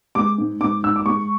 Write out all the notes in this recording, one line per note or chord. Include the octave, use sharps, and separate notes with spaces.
G#3 D6
G#2
G#2 D6
G#2 E6
D6
G#3 C#6